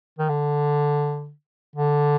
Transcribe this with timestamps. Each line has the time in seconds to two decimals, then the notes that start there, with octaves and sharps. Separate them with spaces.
0.18 D#3
0.29 D3
1.76 D3